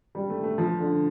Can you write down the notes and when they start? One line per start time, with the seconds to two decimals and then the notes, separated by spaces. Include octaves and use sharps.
0.15 G3
0.30 A3
0.43 A3
0.58 F3
0.80 D3